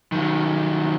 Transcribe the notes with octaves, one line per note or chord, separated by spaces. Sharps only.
D#3 F#3